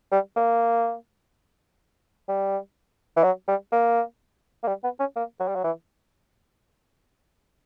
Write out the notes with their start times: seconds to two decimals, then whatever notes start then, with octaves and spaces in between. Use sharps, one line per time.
0.12 G3
0.36 A#3
2.28 G3
3.17 E3
3.24 F#3
3.48 G3
3.72 A#3
4.63 A#3
4.68 G3
4.84 B3
5.00 C#4
5.16 A#3
5.40 F#3
5.48 G3
5.55 F#3
5.64 E3